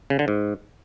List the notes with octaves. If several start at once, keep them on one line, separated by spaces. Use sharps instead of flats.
C#3
D3
G#2